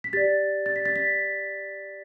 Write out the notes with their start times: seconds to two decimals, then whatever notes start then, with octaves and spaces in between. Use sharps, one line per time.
0.04 B6
0.13 G4 D5 A6
0.66 A6
0.76 B6
0.86 A6
0.96 B6